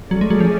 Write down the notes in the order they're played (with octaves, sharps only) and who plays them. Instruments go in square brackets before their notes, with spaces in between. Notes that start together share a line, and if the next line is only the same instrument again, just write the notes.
[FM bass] F#3 [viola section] A3 C#4 G#4 D5
[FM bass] G#3
F#3
F3